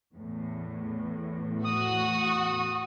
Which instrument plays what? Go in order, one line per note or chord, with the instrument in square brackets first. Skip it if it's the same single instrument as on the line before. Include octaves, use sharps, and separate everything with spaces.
[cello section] E2 A2
[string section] F#4 [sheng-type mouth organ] D#6